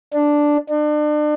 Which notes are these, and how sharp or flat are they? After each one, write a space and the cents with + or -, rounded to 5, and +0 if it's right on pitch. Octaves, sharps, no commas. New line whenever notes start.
D4 +0
D4 +35